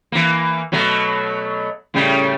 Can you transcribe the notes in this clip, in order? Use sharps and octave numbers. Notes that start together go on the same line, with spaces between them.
E3 A#3
B2 F#3 A3
A2 C#3 G3